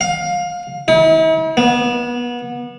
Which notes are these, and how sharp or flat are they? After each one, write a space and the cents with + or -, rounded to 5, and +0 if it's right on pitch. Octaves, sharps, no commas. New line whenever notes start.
F5 +20
E4 -45
B3 -30